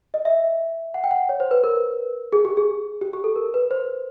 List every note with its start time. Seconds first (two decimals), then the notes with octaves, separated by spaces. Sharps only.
0.14 D#5
0.25 E5
0.94 F#5
1.04 G5
1.11 F#5
1.29 C#5
1.40 C5
1.51 B4
1.64 A#4
2.33 G#4
2.45 G4
2.57 G#4
3.02 G4
3.13 G4
3.24 A4
3.36 A#4
3.54 B4
3.71 C5